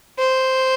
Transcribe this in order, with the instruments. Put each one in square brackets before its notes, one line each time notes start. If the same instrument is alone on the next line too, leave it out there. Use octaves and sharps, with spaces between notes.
[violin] C5